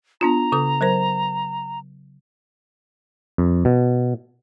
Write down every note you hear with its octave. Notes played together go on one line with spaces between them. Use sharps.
B3 D4 F4 A#5
C#3 A4 D#6
F#3 A#4 C5
F2
B2